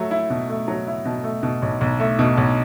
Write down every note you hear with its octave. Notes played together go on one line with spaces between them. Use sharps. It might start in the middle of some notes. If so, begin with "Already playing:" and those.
Already playing: F#3 A3
E4
B2
A3
F#3
E4
B2
A3
B2
B1
B1
A3
B2
B1